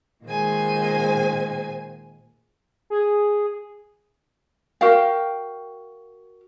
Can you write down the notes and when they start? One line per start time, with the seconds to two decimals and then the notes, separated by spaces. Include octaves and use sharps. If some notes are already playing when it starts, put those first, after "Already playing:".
0.24 A#2 D#3 G#3 C5 G#5
2.90 G#4
4.81 F#4 A#4 F5 G5